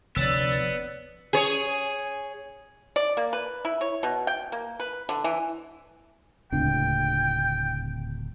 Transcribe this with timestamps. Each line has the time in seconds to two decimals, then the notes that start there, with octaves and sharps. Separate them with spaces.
0.16 F1 D2 B3 C#5 D5 E6 A6
1.33 G#4 C#5
2.96 D5
3.17 A#3
3.33 B4
3.65 E4
3.81 C#5
4.03 B2
4.27 G5
4.52 A#3
4.80 B4
5.09 D3
5.24 E3
6.52 D1 C#2 D4 G5